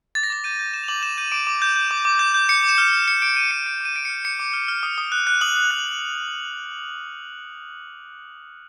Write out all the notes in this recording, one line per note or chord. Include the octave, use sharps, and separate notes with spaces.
D6 A6
A#6
D6 A6
G6 D#7
G6
D6 E7
F7
D6 F#7
G6 E7
G6 D#7
D6 D7
D6
G6
G6
D6
D6
G6
G6
D6 C#7
D6 E7
F6
F6
D6 C#7
D6 D7
F6 D#7
F6 C#7
D6 D7
D6 D#7
F6 D7
F6 C#7
D6 C#7
D6
F6
F6
D#6
D#6
F#6
F#6
D#6 F#7
D#6
F#6